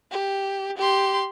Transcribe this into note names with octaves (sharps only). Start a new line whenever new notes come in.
G4
G4 C6